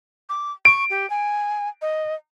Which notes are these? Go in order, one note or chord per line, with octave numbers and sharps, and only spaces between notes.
D6
C#6 D7
G4
G#5
D#5